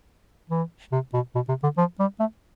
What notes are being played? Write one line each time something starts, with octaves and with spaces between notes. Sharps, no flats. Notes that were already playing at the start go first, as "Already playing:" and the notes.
E3
C3
B2
B2
C3
D3
F3
G3
A3